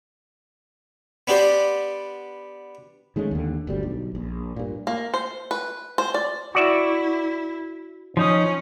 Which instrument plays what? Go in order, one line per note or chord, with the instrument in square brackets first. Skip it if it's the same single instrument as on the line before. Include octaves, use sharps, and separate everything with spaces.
[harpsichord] B3 D4 G4 C5 D5
[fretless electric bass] D#3 G#3 A3 C#4
D#2 D3
G1 D2 G3
B1
A#1
G2 A#2
[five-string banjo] A#3
C5
B4
C5
D5
[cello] E4 [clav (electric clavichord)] F#4 D5 E5
[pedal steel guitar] F3 D#4 D#6 [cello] C#4